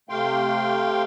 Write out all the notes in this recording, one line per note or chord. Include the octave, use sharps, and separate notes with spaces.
C3 A3 F5 G5 C6